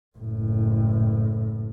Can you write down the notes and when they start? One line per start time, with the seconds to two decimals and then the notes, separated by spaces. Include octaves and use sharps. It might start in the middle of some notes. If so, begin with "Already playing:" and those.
0.19 F#1 A2